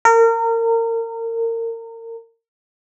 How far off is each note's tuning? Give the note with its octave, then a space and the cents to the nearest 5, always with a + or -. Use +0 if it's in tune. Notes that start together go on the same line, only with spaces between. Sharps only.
A#4 -30